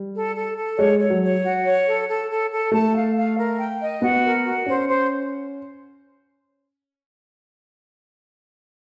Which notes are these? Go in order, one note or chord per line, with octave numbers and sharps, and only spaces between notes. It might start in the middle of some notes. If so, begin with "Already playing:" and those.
Already playing: G3
A4
A4
A4
G#3 C#5
C#5
F#3
C#5
F#4
C#5
A4
A4
A4
A4
A3 A5
F5
F5
A#4
G5
D#5
B3 F#4
A#4
F#4
C#4 C5
C5